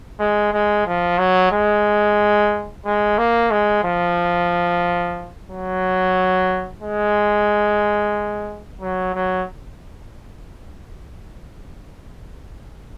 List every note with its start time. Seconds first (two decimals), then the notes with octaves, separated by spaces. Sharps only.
0.19 G#3
0.53 G#3
0.86 F3
1.18 F#3
1.52 G#3
2.85 G#3
3.18 A#3
3.51 G#3
3.84 F3
5.50 F#3
6.82 G#3
8.81 F#3
9.15 F#3